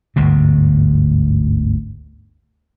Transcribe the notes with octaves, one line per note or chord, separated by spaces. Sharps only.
G1 D2 G#2 B2